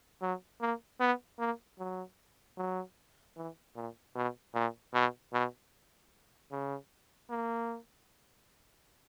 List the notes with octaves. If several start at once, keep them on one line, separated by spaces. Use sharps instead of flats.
F#3
A#3
B3
A#3
F#3
F#3
E3
A#2
B2
A#2
B2
B2
C#3
A#3